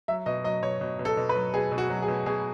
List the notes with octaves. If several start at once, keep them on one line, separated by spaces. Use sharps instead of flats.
F#3 E5
B2 D#5
F#3 D#5
B2 C#5
B2
B2
A4
B2
B4
F#3
B2 G#4
B2
F#4
F#3
G#4
B2
B2 G#4